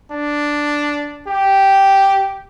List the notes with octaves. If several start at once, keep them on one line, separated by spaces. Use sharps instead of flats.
D4
G4